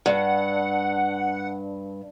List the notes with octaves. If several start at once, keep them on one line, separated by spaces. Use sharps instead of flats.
G2 F#5